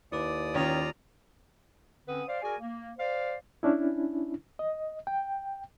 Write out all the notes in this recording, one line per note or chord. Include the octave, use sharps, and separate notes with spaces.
D#2 E4 B4 D5 D6 D#6
D#3 C#4 F4 A#5
D3 C4 C#4 B4 F#5 D#6
C5 D5 F5
F#4 G#4 A#4 D5 G#5
A#3
C5 D5 F5
C#4 D4 E4
D#5
G5